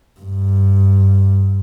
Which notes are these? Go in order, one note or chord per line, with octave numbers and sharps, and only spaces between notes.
G2